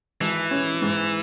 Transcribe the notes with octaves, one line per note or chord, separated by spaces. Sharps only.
G#1 E3
C#4
G#2